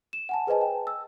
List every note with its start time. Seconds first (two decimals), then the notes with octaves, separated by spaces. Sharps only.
0.13 E7
0.29 F#5 G#5 A5
0.47 G#4 B4 C5 D#5 G#5 A5
0.61 G5
0.87 E6